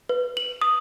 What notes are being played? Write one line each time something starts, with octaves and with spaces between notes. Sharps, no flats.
B4
F#7
D#6